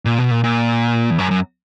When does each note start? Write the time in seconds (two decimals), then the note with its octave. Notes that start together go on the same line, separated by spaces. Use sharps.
0.05 A#2
0.19 B2
0.31 A#2
0.44 A#2
1.11 E2
1.19 F#2
1.31 F#2